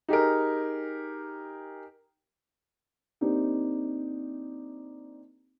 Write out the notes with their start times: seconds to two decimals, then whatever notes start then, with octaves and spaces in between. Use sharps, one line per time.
0.08 D#4 G4 G#4 A#4
3.21 A#3 C4 D4 D#4 G4